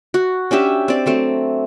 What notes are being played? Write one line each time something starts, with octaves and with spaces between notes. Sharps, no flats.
F#4
C#4 D4 G4 E5
C4 D5
F#3 A3 C4